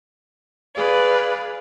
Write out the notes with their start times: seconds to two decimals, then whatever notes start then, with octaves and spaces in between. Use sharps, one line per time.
0.75 G#4 B4 D5 F5